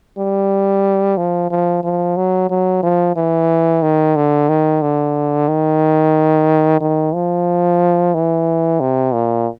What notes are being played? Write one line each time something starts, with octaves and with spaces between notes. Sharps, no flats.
G3
F3
F3
F3
F#3
F#3
F3
E3
D#3
D3
D#3
D3
D#3
D#3
F3
E3
C3
A#2